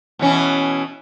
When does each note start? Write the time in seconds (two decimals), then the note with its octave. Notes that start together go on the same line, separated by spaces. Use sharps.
0.19 B2 E3 C#4